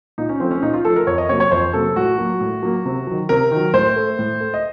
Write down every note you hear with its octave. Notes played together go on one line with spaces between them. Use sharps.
A#2 D#4
C#4
F3 A3 C4
C#4
A#2 D#4
F4
F3 A3 A4
A#4
F2 C#5
D#5
C3 F#3 A#3 C#5
C#5
F2 C5
C3 F#3 A#3 A4
A2 F#4
F#3 A#3
A2
F#3 A#3
C3
D#3 F#3
C3 A#4
D#3 F#3
A2 C5
A3
A2
A3
D#5